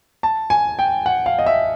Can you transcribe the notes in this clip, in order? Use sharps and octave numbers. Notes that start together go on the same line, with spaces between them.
A5
G#5
G5
F#5
F5
D#5
E5